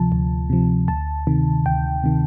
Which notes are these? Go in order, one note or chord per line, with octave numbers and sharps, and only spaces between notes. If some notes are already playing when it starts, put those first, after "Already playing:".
Already playing: D2 C3 F3 A5
D2
C3 F3
D2 A5
C3 D#3
D2 G5
C3 D#3